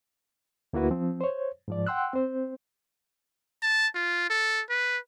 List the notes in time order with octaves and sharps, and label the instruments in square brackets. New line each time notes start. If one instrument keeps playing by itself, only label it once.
[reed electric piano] D2 A#3 E4 F#4 B4
F3 C4
C5 C#5
G#2 F3 D5
F#5 G5 C6 E6 F#6
C4 C5
[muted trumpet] A5
F4
A4
B4